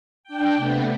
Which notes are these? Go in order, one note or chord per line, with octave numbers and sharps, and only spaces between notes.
D4 G5
C3 A3 B3